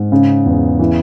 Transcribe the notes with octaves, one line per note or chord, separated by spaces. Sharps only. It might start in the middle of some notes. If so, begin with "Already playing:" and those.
Already playing: G#2
C#3
E2
E3